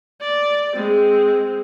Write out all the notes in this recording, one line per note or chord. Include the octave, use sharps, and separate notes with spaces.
D5
G#3 C4